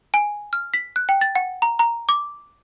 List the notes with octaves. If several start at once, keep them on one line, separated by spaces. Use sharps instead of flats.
G#5
F6
B6
F#6
G5
A6
F#5
A#5
A#5
D6